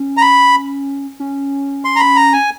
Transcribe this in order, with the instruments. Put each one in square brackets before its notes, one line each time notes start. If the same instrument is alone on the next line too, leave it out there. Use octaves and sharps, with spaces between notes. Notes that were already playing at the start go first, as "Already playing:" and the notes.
Already playing: [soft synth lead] C#4
[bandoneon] A#5
B5
[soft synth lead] C#4
[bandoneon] C6
A#5
B5
A#5
G#5